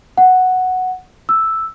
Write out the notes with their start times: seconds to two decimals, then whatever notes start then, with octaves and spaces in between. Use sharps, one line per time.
0.17 F#5
1.29 E6